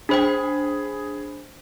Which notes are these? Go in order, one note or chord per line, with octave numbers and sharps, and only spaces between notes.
D4 G#4 C5 G5 B5